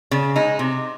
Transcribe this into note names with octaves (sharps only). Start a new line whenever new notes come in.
C#3
G#3 D#4
C3